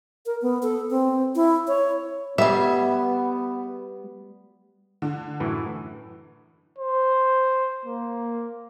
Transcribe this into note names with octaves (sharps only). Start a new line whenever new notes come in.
A#4
B3
A4
C4
E4
C#5
G3 B3 G#4 E5
D3
F#2 A2 E3
C5
A#3